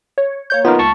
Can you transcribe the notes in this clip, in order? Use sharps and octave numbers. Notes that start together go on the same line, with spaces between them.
C#5
A#3 C#5 G6
B3 D#4 F4 A#4
C#2 A5 C#6